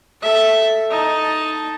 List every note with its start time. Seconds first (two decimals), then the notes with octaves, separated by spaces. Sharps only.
0.22 A4 E5
0.91 D#4 A5